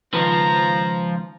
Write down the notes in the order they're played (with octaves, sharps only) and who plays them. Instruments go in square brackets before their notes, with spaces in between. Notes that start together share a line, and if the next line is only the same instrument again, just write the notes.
[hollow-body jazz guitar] C#2 D#3 B4 [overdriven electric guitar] F3 [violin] A#5